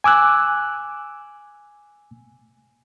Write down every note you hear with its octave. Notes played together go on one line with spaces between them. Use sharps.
G#5 D6 E6 F#6